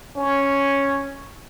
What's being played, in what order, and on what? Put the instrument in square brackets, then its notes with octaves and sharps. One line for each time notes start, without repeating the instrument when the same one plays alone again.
[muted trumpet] C#4